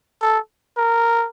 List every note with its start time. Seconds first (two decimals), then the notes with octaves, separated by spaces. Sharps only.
0.22 A4
0.77 A#4